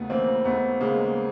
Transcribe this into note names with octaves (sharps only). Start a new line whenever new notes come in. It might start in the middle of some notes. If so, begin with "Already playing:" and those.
Already playing: D#2 C#3 A3 B3
E3 A#3 C4
D#2 A3 B3
C#3 G#3 A#3